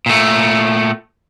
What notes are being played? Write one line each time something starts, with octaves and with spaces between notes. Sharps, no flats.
A#2 A3